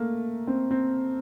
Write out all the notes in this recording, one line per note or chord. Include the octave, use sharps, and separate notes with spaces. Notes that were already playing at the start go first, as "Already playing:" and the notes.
Already playing: A3 A#3
C4
C4